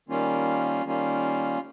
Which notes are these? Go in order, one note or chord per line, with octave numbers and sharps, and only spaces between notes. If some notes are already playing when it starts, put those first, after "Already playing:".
D#3 G3 A#3 C#4 F4
D#3 G3 A#3 C#4 F4